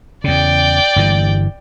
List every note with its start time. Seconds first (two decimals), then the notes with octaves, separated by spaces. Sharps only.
0.24 E2 C#3 D5 G5
0.96 G1 G2 E3